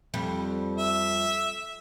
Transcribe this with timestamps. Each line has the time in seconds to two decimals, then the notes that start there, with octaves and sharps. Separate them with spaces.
0.14 F2 G3
0.78 E5